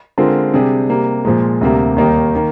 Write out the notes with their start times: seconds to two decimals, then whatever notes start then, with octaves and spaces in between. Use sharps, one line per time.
0.18 D3 G#3 C4 F4 A#4
0.53 C3 G3 D4 G#4
0.90 C3 G3 A#3
1.25 A#2 F3 G#3
1.61 D2 C3 G3 A#3
1.96 D#2 D#3 G3 A#3 D#4
2.35 D#3 A#3